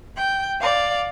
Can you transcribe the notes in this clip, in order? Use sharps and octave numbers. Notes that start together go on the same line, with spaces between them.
G5
D5 F5